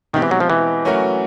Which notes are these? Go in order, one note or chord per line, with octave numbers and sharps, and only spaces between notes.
B2 D#3 G#3 C4 D#4 G4
E3
F#3
F3
E3
F#3 A3 C#4 F#4 A#4